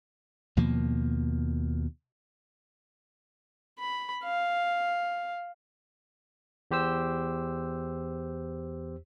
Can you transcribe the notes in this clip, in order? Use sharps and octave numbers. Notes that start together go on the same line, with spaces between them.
D#2 B2 F3 A#3
B5
F5
E2 G4 C5 E6